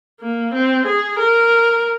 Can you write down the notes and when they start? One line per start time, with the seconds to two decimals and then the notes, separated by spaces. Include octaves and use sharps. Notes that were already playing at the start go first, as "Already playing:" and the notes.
0.21 A#3
0.54 C4
0.86 G#4
1.19 A#4